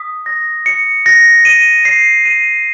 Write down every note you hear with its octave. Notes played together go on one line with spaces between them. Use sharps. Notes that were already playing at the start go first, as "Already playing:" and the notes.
Already playing: D#6 B6
A#6
C#7
A#6
D#7
C7
D#7